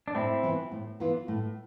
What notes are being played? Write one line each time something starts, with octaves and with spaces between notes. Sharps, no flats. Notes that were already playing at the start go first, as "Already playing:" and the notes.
D4
A2 C4 E4
E3 B3 F4
A2
E3 B3 F4
A2